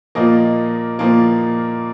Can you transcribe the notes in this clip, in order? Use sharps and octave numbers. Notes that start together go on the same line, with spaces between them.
A#2 F3 A#3 D#5
A#2 F3 A#3